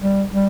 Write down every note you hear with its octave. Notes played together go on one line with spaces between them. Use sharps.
G3
G3